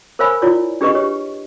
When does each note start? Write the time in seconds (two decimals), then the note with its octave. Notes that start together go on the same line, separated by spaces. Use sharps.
0.19 A#4 C5 C#5 F5 G#5 B5
0.42 E4 F4 C#5 D5
0.81 D4 G4 G#4 B4 D#5 C#6
0.95 G4 C#5